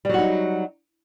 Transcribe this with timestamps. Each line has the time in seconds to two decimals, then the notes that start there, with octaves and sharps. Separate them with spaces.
0.05 G3
0.09 F#3
0.14 F#4
0.18 D#4